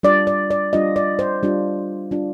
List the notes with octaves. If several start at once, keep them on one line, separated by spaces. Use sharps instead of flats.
G3 D4 F4 D5
D5
D5
G3 D4 F4 D#5
D5
C5
G3 D4 F4
G3 D4 F4